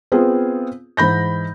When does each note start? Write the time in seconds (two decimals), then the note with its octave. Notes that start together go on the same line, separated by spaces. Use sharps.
0.12 B3 C4 F4 G#4
0.97 G#2 E3 B5 G6 A#6